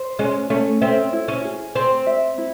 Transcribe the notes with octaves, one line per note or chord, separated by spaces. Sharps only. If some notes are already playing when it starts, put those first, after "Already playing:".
Already playing: C5
G#3 C#4
A3 C#4
C4 E5
E4
C#4
G#4
C4 C5
E5
E4